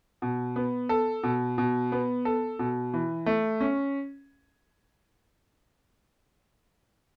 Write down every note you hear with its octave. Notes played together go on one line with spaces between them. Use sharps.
B2
B3
A4
B2
B2
B3
A4
B2
E3
A3
C#4